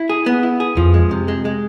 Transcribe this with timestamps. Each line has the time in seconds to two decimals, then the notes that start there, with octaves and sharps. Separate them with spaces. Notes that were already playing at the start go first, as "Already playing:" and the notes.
Already playing: E4
0.09 G#4
0.26 B3
0.43 E4
0.60 G#4
0.77 F2 F3
0.94 G#3
1.11 C3
1.28 G#3
1.45 G#3